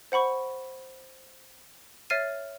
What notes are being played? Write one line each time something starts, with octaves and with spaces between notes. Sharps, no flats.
C5 F#5 B5 C#6
C#5 E5 F6 A6 C7 D#7